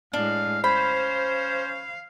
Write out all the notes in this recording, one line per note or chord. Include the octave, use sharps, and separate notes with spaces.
A2 G#3 D4 F5
C#4 C5 F5 B5